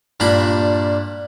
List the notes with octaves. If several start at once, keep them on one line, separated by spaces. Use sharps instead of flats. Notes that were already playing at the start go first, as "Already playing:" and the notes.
G2 A#2 D4 B5 D6